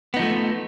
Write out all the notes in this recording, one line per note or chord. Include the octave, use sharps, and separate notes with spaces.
F3 A3 B3 D#4